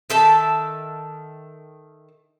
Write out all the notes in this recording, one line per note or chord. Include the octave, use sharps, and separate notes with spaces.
D#3 A4 E5 A5